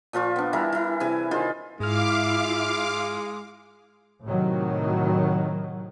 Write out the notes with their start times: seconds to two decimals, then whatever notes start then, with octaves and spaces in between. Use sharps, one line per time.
0.13 A#2 F3 F4 C#6
0.36 B3 D4
0.53 E3 G3 E4 A#4
0.72 E3 E4
1.00 C3 E3 G#4 G#5
1.31 D#3 F4 G#4 C5
1.80 G#2 G#3 E4 F4 F5 D6 F6
4.25 A2 C3 D#3 F#3